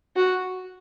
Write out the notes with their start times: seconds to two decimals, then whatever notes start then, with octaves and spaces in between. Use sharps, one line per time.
0.16 F#4